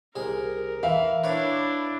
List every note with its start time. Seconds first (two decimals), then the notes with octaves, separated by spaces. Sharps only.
0.16 C2 G#4 A#4
0.83 E3 E5 F5
1.24 D4 E4 B4 C#5